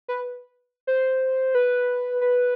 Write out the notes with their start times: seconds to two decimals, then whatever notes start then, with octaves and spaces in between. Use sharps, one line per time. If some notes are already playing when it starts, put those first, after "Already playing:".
0.08 B4
0.87 C5
1.55 B4
2.21 B4